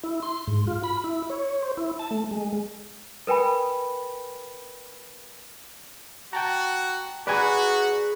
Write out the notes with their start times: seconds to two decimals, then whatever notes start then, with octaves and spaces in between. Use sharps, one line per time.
0.03 E4
0.22 C6
0.47 G#2
0.67 F4
0.84 B5
1.04 E4
1.30 C#5
1.62 C5
1.77 E4
1.99 A5
2.11 A3
2.31 G#3
3.27 A#4 B4 G5 G#5 B5
6.33 F#4 G5 A5 A#5
7.27 F#4 G#4 B4 D5 G#5 A#5